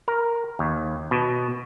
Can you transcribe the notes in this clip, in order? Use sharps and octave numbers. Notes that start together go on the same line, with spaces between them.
A#4
D#2
B2